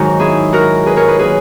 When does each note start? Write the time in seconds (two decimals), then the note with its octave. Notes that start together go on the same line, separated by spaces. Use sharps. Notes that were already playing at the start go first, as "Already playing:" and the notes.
Already playing: G#2 D#3 F#3 D#4 F#4
0.20 E4 G#4
0.53 F#4 A#4
0.86 G#4 B4
0.97 A#4 C#5
1.08 G#4 B4
1.19 A#2 F#3 G#4 B4